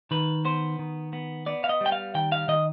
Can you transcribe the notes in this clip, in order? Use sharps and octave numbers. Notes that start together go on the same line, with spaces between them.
D#3 B4
B3 C5
D#3
B3
B3 D5
F5
D#5
G3 G5
F5
D#3 G5
F5
D#3 D#5